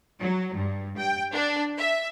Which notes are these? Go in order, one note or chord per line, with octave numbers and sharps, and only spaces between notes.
F#3
G2
G5
D4
E5